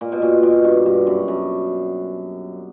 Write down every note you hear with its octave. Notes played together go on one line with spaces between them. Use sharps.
A#2
B2
A#2
B2
G2
G2
F#2
F#2